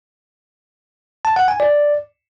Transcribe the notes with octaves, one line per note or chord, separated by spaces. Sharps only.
A5
F#5
G#5
D5